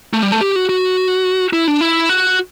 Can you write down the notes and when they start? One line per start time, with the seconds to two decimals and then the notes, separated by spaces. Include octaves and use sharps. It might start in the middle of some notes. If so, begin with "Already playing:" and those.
0.13 A3
0.23 G3
0.32 A3
0.41 G4
0.56 F#4
0.69 F#4
1.53 E4
1.68 D4
1.81 E4
2.09 F#4